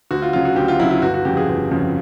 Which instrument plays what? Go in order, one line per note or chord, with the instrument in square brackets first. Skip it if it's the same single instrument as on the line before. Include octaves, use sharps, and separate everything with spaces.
[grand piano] D2 F#4
F4
C#3 F#3 F4
F#4
D2 G4
F4
C#3 F#3 E4
F4
G1 F#4
F#4
F2 C#3 G4
G#4
G1
F2 C#3